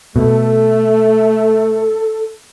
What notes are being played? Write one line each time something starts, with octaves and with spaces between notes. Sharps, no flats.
B2 A3 A4